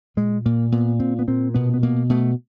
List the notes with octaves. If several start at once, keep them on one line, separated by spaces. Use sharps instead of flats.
A#2 G#3
A#2 A#3
A#2 B3
A#2 C4
B3
A#2 C4
B2 B3
B3
B2 A#3
B2 A3